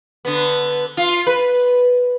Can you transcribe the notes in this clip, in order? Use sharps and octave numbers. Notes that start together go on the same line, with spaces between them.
D3 B3
F4
B4